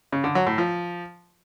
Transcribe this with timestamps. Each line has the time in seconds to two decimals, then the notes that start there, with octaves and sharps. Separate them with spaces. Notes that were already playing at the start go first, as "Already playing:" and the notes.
0.13 C#3
0.24 D3
0.35 F#3
0.47 A2
0.58 F3